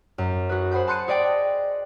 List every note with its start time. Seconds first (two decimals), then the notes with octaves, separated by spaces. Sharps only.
0.18 F#2
0.49 F#4 G#4 B4
0.71 G#4 C5 F#5 B5 G6
0.87 A5 C6 F#6 G6 C#7 D#7
1.08 G#4 D5 D#5 G5